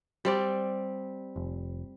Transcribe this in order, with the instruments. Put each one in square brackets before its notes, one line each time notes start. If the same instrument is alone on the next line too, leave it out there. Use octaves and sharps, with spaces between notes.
[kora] G3 C4 D5
[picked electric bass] F1